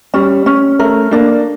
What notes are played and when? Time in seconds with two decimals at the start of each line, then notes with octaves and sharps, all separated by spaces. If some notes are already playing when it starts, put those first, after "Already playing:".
0.14 G3 C#4
0.46 C#4
0.79 A3 A#4
1.11 A#3 D4